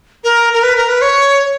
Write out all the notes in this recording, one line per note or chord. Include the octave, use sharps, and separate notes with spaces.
A#4
A#4
B4
A#4
B4
C#5